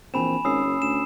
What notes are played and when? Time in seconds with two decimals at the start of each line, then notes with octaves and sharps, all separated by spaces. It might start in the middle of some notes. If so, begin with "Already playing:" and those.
0.14 A#1 E3 C4 G#5 B5 E7
0.45 G#1 C#4 D#6 E6 C7
0.65 F#1
0.82 D2 E7